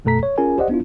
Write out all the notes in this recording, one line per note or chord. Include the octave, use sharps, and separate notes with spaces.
F#2 B2 A3 A4 A#5 B6
C#5
C#4 F4 G#4 A#4 G#5
G4 C5 D5 D#5 F#5
B3 D4 E4 F4